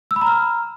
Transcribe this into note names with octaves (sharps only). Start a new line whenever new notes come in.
E6
B5
A#5
F6